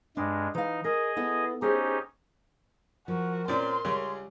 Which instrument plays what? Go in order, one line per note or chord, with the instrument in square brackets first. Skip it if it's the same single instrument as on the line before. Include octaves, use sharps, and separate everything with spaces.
[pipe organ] G2 G#3 [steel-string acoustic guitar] D4
[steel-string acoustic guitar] E3 F5 [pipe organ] D#4
[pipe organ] G#4 D#5 [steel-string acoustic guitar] A#4
[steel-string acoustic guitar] B3 E4 A4
[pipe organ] C#4 D#4 G4 [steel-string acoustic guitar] G#4 C5
[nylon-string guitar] F3 [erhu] F#4 [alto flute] A#4
[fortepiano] A#2 C4 D5 [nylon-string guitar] C#4 [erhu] C6
[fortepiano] C#2 C#3 C#4 [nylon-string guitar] G3